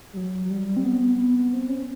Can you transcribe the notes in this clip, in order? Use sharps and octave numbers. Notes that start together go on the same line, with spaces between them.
G3
F#3
F#3
G3
C4
B3
B3
C4
C#4